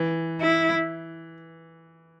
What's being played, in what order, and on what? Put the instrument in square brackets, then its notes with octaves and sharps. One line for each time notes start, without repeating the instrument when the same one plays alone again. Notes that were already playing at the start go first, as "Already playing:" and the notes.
Already playing: [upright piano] E3
[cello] E4